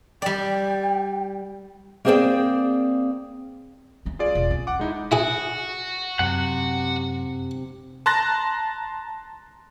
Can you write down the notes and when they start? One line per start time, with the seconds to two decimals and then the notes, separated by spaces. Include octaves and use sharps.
0.22 G3 D5 G5
2.05 A#3 C4 G#4 C5 D5 G5
4.06 G#3 C#4
4.19 F4 G#4 D5
4.35 E1
4.51 C#4
4.67 F#5 D6
4.79 G#3 D#4 E4
5.12 E4 F#4 G#4
6.19 F#2 C3 F#5
8.06 A5 A#5 C6 F#6 A6 A#6